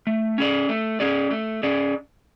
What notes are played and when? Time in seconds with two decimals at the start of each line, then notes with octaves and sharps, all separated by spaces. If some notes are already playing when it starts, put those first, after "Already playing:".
0.07 A3
0.38 C#4 G#4 D5
0.69 A3
1.00 C#4 G#4 D5
1.31 A3
1.63 C#4 G#4 D5